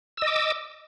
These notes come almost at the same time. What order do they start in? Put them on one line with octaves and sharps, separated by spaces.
E6 D#5 D6